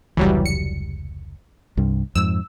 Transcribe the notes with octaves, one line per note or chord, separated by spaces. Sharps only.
F1 C#2 E3 F#3 G3
C#7
C2 G2
F2 G#2 E6